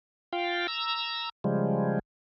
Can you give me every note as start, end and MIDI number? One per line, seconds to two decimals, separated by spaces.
0.33 0.67 65
0.33 0.67 77
0.33 0.67 79
0.68 1.29 82
0.68 1.29 88
1.44 1.99 49
1.44 1.99 53
1.44 1.99 55
1.44 1.99 56